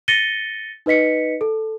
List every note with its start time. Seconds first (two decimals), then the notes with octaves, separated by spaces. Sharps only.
0.08 A6 A#6 C#7 D#7 G7
0.86 D#4 B4 D#5 B6 C#7
1.41 A4